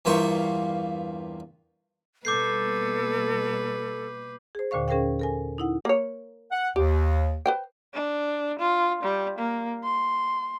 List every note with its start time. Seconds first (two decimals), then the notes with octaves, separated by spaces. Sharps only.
0.05 E2 G2 A#3 F4 C5 C#6
2.25 B2 G3 A#3 A4 B4 D6 G6 C7
4.55 G#4 C5
4.71 D#2 A#2 D3 C5 F5 C#6
4.88 C#4 G#4 A#4 C5 F5 G5
5.19 A4 A#4 G#5
5.58 D#4 E4 F#5
5.85 A#3 C#5
6.51 F#5
6.76 D#2 G4
7.46 B4 C5 G5
7.94 D4
8.59 F4
9.03 G3
9.39 A#3
9.84 C6